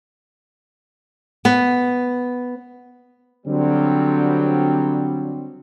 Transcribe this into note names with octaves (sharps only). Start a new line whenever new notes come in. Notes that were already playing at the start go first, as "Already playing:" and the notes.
B3
D3 F#3 G3 C4